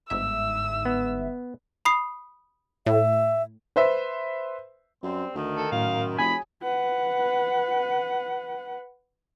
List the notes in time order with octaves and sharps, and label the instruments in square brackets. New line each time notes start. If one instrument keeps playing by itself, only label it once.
[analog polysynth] G1 G#2 E5 [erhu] E6
[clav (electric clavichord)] B3
[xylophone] B5 D#6 C7
[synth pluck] A2 [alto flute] E5
[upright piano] B4 C5 E5
[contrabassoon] F#2 [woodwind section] G3 C4
[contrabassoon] D2 [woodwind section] D#3
[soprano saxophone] A4
[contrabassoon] F#2 [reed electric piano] A2 [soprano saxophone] F5
[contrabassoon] F1 [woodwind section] F#3 G#4 D#6 [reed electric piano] G#5 [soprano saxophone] B5
[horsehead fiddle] B4 F#5